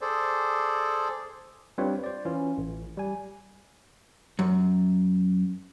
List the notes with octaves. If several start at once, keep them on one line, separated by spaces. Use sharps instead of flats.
G#4 A4 C5 D5
G3 C4 D4 F4 B4 C#5
C5 D5
E3 C#4 F4
A1
G3 G#5
F#2